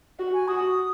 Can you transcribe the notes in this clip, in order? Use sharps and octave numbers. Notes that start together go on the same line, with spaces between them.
F#4
G#5
F#4 D#6